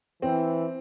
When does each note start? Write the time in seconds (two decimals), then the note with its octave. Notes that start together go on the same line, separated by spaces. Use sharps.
0.22 E3 C4